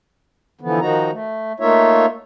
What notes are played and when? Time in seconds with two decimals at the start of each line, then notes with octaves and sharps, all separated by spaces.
0.61 D3 E3 F3 B3
0.80 D#3 F3 D#4 F#4 A#5
1.12 A3
1.60 A3 A#3 D#4 F4 C#5 E5